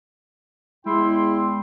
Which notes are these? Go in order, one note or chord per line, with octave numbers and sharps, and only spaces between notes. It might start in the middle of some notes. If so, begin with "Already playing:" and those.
E2 G#3 E4 G5 C6